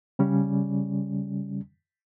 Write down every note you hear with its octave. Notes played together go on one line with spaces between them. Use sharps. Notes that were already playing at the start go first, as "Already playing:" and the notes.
C#3 G3 C#4